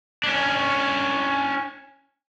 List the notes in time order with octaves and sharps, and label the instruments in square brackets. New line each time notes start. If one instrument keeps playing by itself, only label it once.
[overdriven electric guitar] C#4 D4